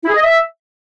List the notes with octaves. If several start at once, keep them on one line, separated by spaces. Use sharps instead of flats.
E4
G#4
D#5
E5